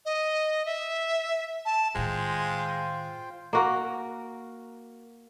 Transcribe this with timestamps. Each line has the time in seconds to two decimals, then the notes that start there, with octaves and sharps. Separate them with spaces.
0.05 D#5
0.66 E5
1.65 A5
1.95 A2 D#3 G#3 F4 C5 G5
3.53 A#3 F#4 A#4